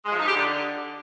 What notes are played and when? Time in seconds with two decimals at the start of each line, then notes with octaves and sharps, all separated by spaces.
0.05 G#3
0.12 F3
0.19 D#4
0.26 G4
0.33 D3